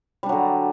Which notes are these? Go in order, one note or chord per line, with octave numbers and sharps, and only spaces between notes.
D3 F#3 G3 D4